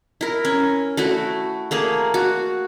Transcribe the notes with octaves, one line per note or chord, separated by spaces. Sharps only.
E4 A#4
C#4
A3 E4 F#4
A3 A#3 G#4
F#4